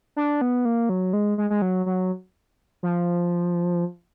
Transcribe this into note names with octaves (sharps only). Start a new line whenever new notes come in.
D4
B3
A#3
F#3
G#3
G#3
G#3
F#3
F#3
F3